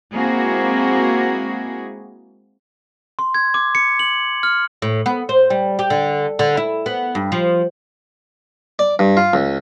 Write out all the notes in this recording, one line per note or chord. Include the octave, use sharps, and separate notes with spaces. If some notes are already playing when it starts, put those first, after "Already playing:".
G#3 A#3 C4 E4 F#4 G#4
C6
G#6
D6
C#7
F#7
F6
A2
B3
C5
G3
G4
D3
D3
E4
B3
G2
F3
D5
G2
F4
C#2